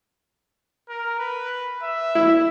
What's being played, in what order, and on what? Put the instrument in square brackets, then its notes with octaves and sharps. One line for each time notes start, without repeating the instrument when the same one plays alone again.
[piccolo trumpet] A#4
B4
E5
[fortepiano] E4